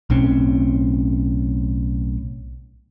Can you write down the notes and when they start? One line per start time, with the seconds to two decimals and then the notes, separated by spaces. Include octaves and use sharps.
0.10 B1 A2 C4 C#4